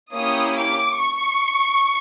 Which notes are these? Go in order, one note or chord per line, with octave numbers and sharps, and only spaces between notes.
A#3 C#4 E4 G4 D#6
D6
C#6